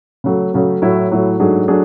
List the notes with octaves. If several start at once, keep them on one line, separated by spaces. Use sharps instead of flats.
C#3 F#3 A3
C#3 F#3 A3
A2 F#3 A3 E4
A2 F#3 A3 E4
G#2 F#3 A3 D4 G#4
F#3 A3 D4 G#4